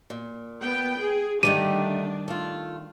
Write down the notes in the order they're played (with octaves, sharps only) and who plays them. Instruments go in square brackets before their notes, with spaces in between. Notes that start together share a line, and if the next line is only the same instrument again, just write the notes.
[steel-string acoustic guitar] A#2
[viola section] B3 G5
G#4
[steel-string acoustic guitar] D3 A3 D#4 [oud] D#3 G3 G4 [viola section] D4 [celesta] D#7
[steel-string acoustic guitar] A3 F4